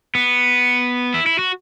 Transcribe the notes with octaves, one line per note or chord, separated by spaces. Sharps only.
B3
E4
E4
F#4